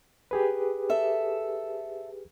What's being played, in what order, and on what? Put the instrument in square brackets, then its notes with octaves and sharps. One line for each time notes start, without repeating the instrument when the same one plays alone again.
[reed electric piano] G4 G#4 B4
[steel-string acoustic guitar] A4 E5